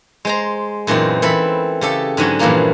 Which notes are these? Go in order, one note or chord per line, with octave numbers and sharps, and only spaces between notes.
G#3 C5 A#5
F#2 A#2 E3 C4 D#4
E3 C4 A4 B5
C#3 G4 A4
G#2 D3 F#3 C#4
G2 A#2 E3 F3 A#3 A#5